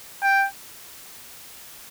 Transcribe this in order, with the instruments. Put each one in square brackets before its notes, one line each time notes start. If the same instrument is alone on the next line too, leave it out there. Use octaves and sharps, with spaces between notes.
[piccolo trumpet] G5